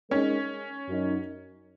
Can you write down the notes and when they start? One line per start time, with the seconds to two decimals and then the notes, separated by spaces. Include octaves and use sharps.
0.11 G#3 C#4 D#4 A#4
0.88 F#2 F#3 D#4